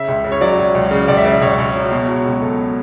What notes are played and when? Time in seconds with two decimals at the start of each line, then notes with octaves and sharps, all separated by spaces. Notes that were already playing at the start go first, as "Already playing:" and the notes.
Already playing: C#3 E5
0.08 C#2
0.24 C#3
0.32 C#5
0.41 F#3 D5
0.58 F#3
0.75 C#2
0.91 C#3
1.08 C#2 D5
1.17 E5
1.24 C#3 D5
1.41 C#2 C#5
1.58 C#2
1.75 F#3
1.92 B2
2.08 F#3
2.26 C#2
2.42 C#2 A4